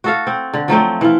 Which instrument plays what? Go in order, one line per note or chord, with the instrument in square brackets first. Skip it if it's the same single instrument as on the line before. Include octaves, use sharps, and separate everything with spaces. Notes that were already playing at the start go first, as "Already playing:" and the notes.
[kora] F#4 A4 F5
C4
D3
F3 F#3 A3 C4
E3 F4